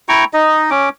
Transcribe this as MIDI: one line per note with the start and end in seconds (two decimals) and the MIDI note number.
0.09 0.25 64
0.09 0.25 79
0.09 0.25 82
0.09 0.25 85
0.33 0.70 63
0.33 0.70 75
0.70 0.89 61
0.70 0.89 86